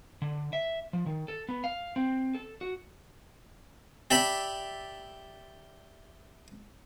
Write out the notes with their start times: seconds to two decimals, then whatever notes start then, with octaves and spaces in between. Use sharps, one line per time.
0.22 D3
0.53 E5
0.93 F3
1.06 D#3
1.28 A4
1.49 B3
1.64 F5
1.96 C4
2.35 A4
2.61 F#4
4.11 G4 D5 E5 A5 B5